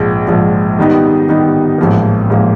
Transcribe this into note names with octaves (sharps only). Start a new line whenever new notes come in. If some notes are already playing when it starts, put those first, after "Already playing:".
Already playing: A#1 G#2 F3 G#3
A#1 G#2 F3 G#3
D#3 G3 B3 D#4 G4
D#3 G3 B3 D#4 G4
A1 G#2 F3 A#3
A1 G#2 F3 A#3